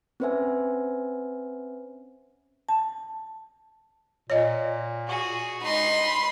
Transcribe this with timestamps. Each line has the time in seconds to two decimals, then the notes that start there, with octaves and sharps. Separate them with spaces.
0.20 C4 C#4 B4 C5 E5 G#5
2.69 A5
4.30 A#2 C#5 D#5
5.07 F#4 G#4
5.62 G#3 D#4 B5 C6